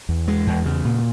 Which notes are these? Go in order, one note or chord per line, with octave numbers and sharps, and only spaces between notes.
E2
G#3
E2
C#3
A#2